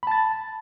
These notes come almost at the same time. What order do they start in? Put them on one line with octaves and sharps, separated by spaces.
B5 A5 A6